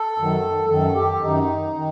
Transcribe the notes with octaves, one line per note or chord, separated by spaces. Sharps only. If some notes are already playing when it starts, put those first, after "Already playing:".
Already playing: A4
F#2 D#3
F#2 D#3 A4
G4
F#2 D#3 D#4
D#3